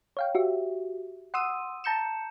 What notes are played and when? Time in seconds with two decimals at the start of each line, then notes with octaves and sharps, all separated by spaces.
0.17 C#5 F5 G5
0.35 F#4 G4 E5
1.34 F#5 C6 D#6 E6 D#7
1.84 A5 A#5 G6 C#7 E7